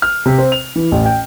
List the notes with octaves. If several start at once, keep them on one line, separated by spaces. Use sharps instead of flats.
F6
C3
C4
F7
E3
A1
G5